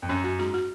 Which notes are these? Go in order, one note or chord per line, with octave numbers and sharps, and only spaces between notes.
F2
F#2 C#4
F#2 F#4
G#2 F#4
F#4